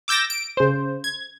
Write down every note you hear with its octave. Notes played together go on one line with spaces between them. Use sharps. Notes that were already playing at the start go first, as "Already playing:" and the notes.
D6 E6 G6 A6 A#6
D7
C#3 C5
G#6